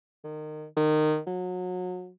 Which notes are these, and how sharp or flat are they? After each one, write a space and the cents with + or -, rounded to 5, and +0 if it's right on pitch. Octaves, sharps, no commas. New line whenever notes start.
D#3 -25
D#3 -20
F#3 -30